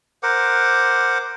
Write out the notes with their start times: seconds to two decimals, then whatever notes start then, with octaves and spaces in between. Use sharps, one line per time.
0.23 A#4 C5 F#5 D6